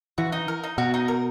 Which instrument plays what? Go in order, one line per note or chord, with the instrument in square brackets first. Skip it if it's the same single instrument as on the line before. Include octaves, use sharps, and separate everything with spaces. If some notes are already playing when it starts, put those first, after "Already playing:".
[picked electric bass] E3 [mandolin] F#4
[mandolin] D#4
A#4
D#4
[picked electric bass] B2 [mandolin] F#4
[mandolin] D#4
A#4